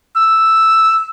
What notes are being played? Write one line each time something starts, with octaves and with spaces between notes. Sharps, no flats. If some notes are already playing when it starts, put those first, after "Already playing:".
E6